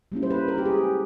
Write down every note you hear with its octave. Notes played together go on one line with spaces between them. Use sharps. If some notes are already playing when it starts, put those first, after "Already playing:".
G3 A#3 C#4 E4
C5
B4
A#4
G4
G#4